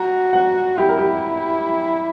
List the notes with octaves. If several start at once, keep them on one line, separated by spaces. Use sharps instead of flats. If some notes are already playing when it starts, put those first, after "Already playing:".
Already playing: F#4 A#5
F#5
E4 G4
A#4
G4